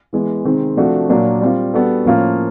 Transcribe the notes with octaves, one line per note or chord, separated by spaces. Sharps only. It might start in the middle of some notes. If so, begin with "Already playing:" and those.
E3 G#3 B3
C3 D#3 G#3 C4
C3 F3 A3 D4 F#4
A#2 F#3 A#3 D4
G3 C4 F4
G3 B3 D4 F#4 A4
A2 F3 A#3 C#4 F4